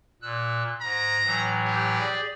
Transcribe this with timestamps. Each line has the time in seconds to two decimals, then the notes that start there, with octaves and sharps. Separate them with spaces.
0.22 A#2 E6 F#6
0.81 G#2 A#5
1.24 A2 E3 F#3
1.65 G4
1.99 G#4 D5